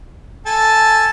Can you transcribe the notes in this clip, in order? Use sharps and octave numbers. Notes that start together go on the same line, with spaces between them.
A4 G#5 A5